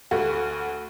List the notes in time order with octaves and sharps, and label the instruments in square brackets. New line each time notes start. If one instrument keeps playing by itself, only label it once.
[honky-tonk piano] D2 A3 F#4